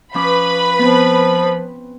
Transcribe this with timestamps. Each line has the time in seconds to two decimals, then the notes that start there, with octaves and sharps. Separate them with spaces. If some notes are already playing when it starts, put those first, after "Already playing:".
0.14 F3 C#4 B4 B5 D6
0.79 F3 B3 C4